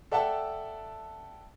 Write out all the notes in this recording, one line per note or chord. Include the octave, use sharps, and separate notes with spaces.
A4 D5 E5 F#5 G5 A5